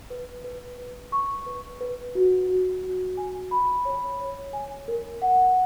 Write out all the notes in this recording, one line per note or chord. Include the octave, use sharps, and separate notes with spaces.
B4
B4
B4
C#6
B4
B4
F#4
F#4
F#4
G#5
B5
C#5
C#5
G#5
A#4
F#5